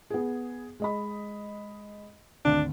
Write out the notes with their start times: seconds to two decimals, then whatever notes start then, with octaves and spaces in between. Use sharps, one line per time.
0.10 B3 G#4
0.80 G#3 D#5 B5
2.45 G#1 D2 D4